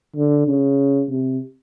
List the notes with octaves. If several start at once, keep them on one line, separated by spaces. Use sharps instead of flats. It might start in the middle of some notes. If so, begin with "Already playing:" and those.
D3
C#3
C3